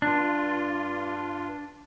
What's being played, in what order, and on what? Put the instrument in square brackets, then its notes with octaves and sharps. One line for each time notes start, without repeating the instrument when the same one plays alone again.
[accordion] G2 F4 [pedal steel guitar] D4